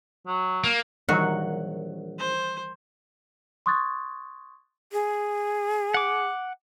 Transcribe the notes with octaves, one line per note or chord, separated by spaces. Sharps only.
F#3
A#3
A#1 D#3 E3 F#3 G3 F#4 F#5
C5
C6 C#6 D#6 F#6 G#6 A6
G#4
F#5 D6